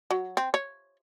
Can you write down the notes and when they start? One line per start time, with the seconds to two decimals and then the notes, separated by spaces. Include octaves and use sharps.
0.11 F#3
0.37 C4
0.54 C#5